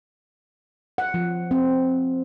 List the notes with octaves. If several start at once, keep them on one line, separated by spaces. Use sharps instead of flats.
F#5
F3
C4